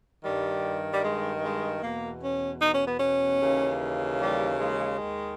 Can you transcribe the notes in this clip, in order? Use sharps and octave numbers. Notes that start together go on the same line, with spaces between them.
G2 D#3 G3
G3
G#3
G#3
E2 B2 A#3
C#4
D#4
C#4
B3
C#4
D#2 C#3 E3
G3
G#3
D#2 D#3